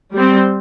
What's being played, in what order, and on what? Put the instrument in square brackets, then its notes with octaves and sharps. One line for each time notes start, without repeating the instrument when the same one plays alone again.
[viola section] G3 C4